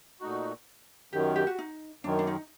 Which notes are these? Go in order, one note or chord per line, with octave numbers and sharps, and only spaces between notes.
A#2 A3 D#4 F#4
F#2 D#3 F#3 G4
G4
F#4
D#4
F#2 D#3 F#3 D4
D4
D#4